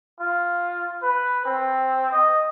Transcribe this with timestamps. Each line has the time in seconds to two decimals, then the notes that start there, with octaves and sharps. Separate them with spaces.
0.20 F4
1.02 B4
1.45 C4
2.12 D#5